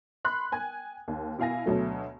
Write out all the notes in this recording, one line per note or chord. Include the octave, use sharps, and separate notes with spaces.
B5 C6 F#6
G5 G#5 G#6
D#2
B2 E4 F5 G#5 A#6
D2 B2 F#3 A3